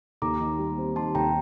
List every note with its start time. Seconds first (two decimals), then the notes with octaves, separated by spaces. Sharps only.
0.22 D#2 A#5 D6
0.40 D#3
0.59 G3
0.78 C4
0.96 D#3 A5 C6
1.15 D#2 G5 A#5